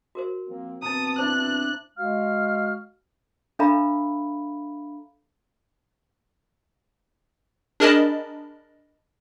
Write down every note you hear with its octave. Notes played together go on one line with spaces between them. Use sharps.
F#4 A#4 C5
F3 A#3 C4
B2 C4 A5 A#5 D#6
D4 E4 C5 F#6
G#3 F#4 F5 F6
D4 A4 E5 F5 A#5 B5
D4 G#4 A#4 D#5 A5 B5